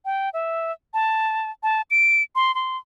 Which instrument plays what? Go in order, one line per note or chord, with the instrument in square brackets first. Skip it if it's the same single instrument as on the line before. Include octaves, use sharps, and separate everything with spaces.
[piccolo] G5
E5
A5
A5
D7
C6
C6